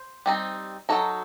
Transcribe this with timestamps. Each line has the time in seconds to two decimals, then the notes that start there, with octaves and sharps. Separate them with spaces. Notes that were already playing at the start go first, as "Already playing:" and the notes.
Already playing: C5
0.26 G3 C4 D#4
0.89 F#3 A3 D#4 A4